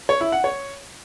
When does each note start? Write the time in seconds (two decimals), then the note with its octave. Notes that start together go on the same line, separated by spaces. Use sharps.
0.09 C#5
0.21 E4
0.32 F#5
0.44 C#5